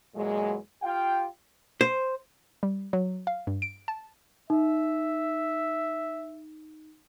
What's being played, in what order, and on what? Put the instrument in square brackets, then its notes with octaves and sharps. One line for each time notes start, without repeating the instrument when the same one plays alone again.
[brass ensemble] E2 A#2 F#3 G#3
F4 G4 F5 G5
[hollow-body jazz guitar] C5
[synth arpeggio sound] G3
F#3
F5
G2
D7
A5
[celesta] D#4 [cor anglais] E5